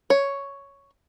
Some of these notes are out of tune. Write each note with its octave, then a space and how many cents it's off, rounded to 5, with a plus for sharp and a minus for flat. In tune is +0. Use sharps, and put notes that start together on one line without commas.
C#5 +5